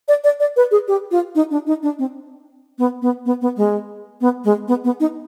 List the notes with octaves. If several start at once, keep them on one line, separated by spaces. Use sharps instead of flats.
D5
D5
D5
B4
G#4
G4
F4
D#4
D4
D#4
D4
C4
B3
B3
B3
B3
G#3
B3
G#3
B3
B3
D#4